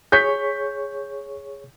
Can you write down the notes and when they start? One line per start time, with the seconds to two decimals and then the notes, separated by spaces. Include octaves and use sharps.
0.12 G#4 C#5 C#6 G6 B6